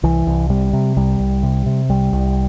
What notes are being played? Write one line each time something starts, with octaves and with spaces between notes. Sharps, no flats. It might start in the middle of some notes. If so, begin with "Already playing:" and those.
C2 E3
C2
C3 G3
C3
C2 G3
C2
C3
C3
C2 G3
C2